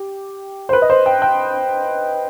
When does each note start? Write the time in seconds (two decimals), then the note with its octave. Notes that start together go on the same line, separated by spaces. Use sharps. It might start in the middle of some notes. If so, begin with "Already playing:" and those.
Already playing: G4
0.69 C5
0.73 B4
0.82 D#5
0.90 C5
1.06 G5
1.22 G5